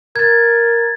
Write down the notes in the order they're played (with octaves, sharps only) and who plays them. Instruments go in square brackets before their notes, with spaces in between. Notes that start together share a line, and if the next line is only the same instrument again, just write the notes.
[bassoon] A#4 [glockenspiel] G#6 A6